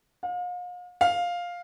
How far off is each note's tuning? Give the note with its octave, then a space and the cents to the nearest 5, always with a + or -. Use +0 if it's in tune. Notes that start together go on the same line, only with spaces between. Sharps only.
F5 +40
F5 +5